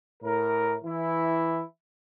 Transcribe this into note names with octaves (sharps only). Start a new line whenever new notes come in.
A2 A#4
E3 E4